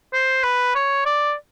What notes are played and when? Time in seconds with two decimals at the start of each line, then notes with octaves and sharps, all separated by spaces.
0.14 C5
0.44 B4
0.75 C#5
1.06 D5